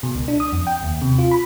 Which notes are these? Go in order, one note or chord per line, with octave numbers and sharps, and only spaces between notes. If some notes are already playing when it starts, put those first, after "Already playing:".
B2
C#2
D4
D#6
F2
G5
D#2
C3
F4
B5